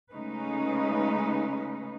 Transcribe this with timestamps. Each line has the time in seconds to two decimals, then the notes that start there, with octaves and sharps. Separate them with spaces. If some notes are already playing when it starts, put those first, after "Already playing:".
0.12 C#3 G#3 A3 C#4 D#4 B4